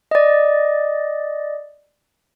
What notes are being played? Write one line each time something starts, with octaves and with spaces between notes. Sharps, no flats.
D5 D#5